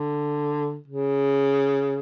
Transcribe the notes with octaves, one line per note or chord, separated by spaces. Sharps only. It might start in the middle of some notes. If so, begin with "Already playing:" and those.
Already playing: D3
C#3